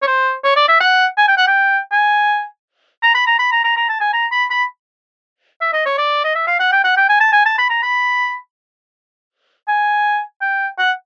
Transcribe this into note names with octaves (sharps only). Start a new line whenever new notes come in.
C#5
C5
C#5
D5
E5
F#5
G#5
G5
F#5
G5
G#5
A#5
B5
A#5
B5
A#5
A#5
A#5
A5
G#5
A#5
B5
B5
E5
D#5
C#5
D5
D#5
E5
F5
F#5
G5
F#5
G5
G#5
A5
G#5
A5
B5
A#5
B5
G#5
G5
F#5